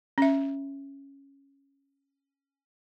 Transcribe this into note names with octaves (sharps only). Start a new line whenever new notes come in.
C#4 E5